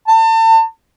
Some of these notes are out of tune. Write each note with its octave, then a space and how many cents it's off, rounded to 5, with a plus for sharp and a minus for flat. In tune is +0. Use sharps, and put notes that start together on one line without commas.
A5 +35